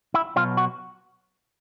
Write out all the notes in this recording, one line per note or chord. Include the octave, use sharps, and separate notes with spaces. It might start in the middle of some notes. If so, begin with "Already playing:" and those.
E4
B2 F#3 F4
F#4